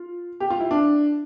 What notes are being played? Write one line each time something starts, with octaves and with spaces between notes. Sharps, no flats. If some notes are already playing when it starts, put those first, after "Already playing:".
Already playing: F4
G4
F4
E4
D4